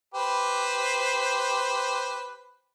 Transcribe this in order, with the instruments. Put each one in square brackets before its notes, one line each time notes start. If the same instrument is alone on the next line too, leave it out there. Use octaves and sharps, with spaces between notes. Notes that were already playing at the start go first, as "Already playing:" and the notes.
[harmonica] G4 B4 C5